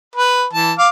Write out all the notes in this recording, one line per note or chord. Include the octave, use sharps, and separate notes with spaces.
B4
E3 A5
F5 D6